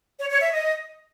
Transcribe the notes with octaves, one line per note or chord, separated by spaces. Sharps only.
C#5
C#5
E5
D#5